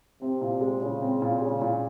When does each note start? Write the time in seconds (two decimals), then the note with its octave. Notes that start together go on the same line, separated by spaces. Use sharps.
0.22 C3 C4
0.41 A#2
0.61 G#3
0.82 A#2 C#3
1.02 C4
1.22 A#2
1.41 C#3 G#3
1.61 A#2